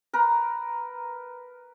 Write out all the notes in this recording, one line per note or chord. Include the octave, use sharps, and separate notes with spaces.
A#4 B4 A#5